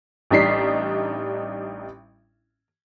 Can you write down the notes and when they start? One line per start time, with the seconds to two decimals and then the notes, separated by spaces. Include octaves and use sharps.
0.30 A1 G3 D4 D#4 B6 C7